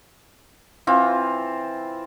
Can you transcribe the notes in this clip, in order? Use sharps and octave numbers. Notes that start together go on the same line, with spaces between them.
E3 C4 F4